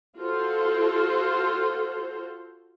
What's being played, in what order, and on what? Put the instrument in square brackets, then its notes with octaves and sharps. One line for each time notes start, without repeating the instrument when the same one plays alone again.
[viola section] F4 F#4 A4 C5